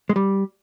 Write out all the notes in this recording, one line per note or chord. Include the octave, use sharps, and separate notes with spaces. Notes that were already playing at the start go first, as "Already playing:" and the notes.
G#3
G3